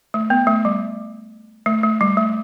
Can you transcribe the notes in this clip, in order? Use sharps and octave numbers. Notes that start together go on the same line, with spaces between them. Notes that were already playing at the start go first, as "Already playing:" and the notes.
A3
B3
A3
G3
A3
A3
G3
A3